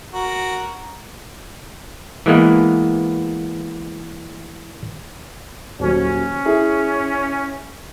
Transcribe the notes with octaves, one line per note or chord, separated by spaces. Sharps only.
F#4 A#4
E3 G#3 A#3 B3
D#1 F#3 C#4
E4 G#4